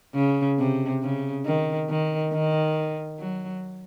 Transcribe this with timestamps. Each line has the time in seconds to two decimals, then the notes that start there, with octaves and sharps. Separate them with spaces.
0.14 C#3
0.58 C3
1.02 C#3
1.45 D#3
1.89 D#3
2.33 D#3
3.19 F#3